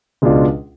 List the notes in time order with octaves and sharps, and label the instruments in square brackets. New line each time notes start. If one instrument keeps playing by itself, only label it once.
[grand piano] C#2 B2 G#3 D4 F4